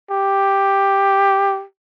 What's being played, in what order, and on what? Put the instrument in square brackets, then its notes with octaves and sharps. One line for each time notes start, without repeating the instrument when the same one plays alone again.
[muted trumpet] G4